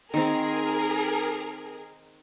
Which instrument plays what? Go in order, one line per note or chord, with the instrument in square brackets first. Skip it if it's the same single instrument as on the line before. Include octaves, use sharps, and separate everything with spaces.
[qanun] D#3 C4 [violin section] G#4 A#4